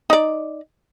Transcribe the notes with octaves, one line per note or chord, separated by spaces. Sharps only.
D#4 D5